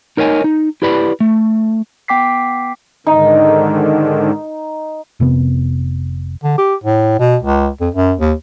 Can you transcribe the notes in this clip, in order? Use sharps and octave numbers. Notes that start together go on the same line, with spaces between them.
D#4 A#4 C#5 D#5 G#5
D#4
E4 G4 B4 D5 B5
A3
B3 G5 D6 B6 C7
G#2 D3 D#3 D#4
F1 C3 B3
D3
G4
A2
B2
C#2
F2
F#2
D#2